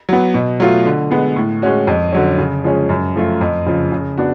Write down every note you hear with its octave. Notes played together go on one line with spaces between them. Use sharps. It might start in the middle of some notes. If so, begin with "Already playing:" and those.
F#3 B3
B2
F#3 A3 F4
D3
G#3 B3
A2
G#3 C#4 F#4
F2
D3 F#3 C#4
C#3
F3 G#3 C#4 G#4
F#2
F3 A3 F4
F2
C#3 F3
C#3
B3 D4 F#4